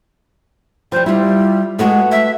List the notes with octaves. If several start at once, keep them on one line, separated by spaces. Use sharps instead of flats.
F3 G3 C5
G3 E4 F4
G#3 A3 B3 F#4
E5